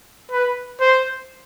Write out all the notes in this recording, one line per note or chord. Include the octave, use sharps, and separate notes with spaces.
B4
C5